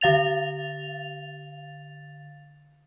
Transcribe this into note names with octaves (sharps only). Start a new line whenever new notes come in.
D3 F5 A6 F7